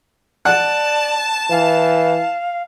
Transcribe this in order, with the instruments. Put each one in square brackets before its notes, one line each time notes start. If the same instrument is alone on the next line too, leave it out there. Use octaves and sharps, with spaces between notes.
[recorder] D5 [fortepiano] F#5 [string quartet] A5
[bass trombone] E3 [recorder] F5